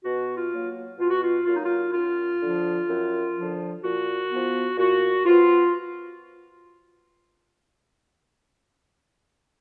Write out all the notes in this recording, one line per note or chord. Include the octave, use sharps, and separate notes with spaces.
B2 F#4
F4
F#3 A#3
B2 F4
F#4
F4
F#3 A#3 F4
D#4
F4
F#2 F4
D3 F3
F#2
D3 F3
A#2 F#4
F3 B3
A#2 F#4
F3 B3 F4